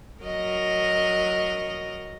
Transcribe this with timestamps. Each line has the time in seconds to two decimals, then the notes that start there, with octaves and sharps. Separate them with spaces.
0.23 F#3 A#4 D#5